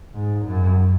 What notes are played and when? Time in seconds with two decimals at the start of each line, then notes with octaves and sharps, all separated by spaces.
0.14 G#2
0.46 F#2